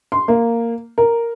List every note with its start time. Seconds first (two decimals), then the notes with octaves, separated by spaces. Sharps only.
0.12 C6
0.28 A#3
0.98 A#4